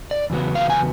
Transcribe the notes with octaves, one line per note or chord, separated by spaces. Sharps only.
D5
E2 C#3 F#3 B3
F5
G#5